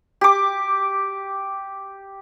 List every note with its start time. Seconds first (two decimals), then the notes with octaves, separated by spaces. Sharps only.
0.21 G4 D6